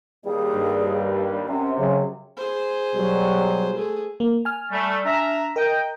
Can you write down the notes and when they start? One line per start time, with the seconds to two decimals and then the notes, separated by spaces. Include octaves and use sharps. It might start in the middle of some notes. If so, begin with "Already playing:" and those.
0.25 D#2 G3 G#4
0.55 G2
1.48 F#2 C3 C#4
1.78 C#3 F#3
2.37 G#4 C5
2.94 B2 F#3 G3
3.77 A3 G#4
4.20 A#3
4.45 G#5 F6
4.71 G3 A3
5.05 D4 E5 A#5
5.56 A#4 D#5 G5